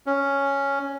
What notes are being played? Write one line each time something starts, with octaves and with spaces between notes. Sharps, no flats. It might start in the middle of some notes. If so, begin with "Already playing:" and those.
C#4